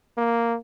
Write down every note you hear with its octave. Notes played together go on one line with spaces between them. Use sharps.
A#3